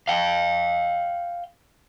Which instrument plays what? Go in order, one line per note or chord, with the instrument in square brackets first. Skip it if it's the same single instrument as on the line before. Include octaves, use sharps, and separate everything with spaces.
[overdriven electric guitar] F5 G5